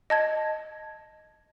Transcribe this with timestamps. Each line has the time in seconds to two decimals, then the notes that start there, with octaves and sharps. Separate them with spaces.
0.10 D#5 A5 G#6